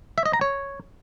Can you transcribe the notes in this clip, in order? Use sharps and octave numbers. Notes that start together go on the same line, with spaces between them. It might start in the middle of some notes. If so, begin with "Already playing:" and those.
E5
D#5
A#5
C#5